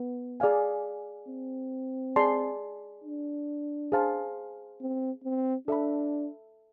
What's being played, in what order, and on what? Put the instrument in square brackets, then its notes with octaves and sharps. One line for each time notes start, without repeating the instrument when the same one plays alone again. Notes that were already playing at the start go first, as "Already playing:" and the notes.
Already playing: [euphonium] B3
[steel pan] G#4 D5 F5 G#5
[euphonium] C4
[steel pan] G#4 D5 A5 C6
[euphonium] D4
[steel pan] G#4 C5 F5 A5
[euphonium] C4
C4
[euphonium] D4 [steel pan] A4 E5 B5